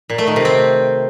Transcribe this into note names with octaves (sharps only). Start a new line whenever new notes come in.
A#2
A3
D#3
C3
C4